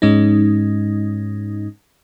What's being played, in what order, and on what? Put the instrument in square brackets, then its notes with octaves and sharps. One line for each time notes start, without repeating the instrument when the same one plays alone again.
[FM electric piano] G#2 G#3 C#4 D#4